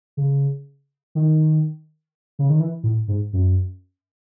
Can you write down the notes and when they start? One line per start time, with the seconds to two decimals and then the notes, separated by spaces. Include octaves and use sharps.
0.17 C#3
1.15 D#3
2.39 C#3
2.50 D#3
2.60 E3
2.83 A2
3.08 G#2
3.33 F#2